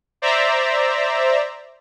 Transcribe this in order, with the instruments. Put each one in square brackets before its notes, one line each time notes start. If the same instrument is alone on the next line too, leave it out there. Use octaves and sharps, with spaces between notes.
[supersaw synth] C5 D5 E5 A#5